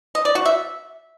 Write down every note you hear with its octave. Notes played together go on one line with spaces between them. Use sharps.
D#5
D5
F#4
E5